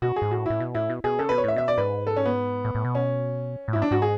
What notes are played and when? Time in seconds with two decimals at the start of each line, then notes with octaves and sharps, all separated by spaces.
0.02 B2 F#4
0.16 G#4
0.22 G#2
0.31 A2 F#4
0.46 A2 E4
0.60 B2
0.75 A2 E4
0.90 B2
1.04 B2 G#4
1.19 C#3 A4
1.29 B2 B4
1.38 C#5
1.44 A2 E5
1.56 B2 E5
1.68 D5
1.78 G#2 B4
2.07 A4
2.16 C#4
2.25 B3
2.64 A2
2.75 A2
2.85 B2
2.95 C#4
3.68 A2
3.73 G#2 E4
3.82 D4
3.91 G#2 F#4
4.02 G#4